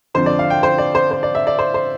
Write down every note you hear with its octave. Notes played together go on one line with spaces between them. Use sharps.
F2 D3 F3 C5
D5
F5
G5
C5
D5
C5
C5
D5
E5
D5
C5
C5